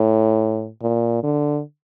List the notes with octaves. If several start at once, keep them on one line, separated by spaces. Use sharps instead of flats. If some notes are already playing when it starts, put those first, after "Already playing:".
Already playing: A2
A#2
D3